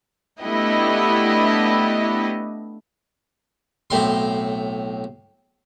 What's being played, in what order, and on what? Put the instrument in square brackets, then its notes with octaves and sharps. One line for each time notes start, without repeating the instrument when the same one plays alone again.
[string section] A3 B3 D4 E4 G4 D#5
[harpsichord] B1 A2 C4 C6